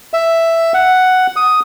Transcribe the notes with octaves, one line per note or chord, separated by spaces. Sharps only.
E5
F#5
D#6